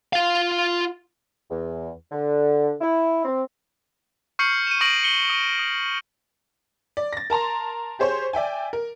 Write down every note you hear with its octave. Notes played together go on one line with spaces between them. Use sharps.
F4 F5
E2
D3
E4
C4
C#6 F6 G6 C7 C#7 F#7
D#7 E7
C#6 D#6 A#6 D7 D#7 F#7
C#7 F#7 G7
D#6 D#7
D#6
D5
A6 A#6
A#4 A5 A#5 C6
G4 G#4 C5 C#5 C6
D5 E5 G5 G#5
A#4